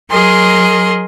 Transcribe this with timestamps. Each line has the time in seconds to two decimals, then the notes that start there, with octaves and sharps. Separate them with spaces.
0.10 F#3 G#4 A#4 D#5 C6